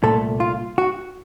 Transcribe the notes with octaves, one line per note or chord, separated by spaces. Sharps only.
C2 A#2 A3 A4
F4
F#4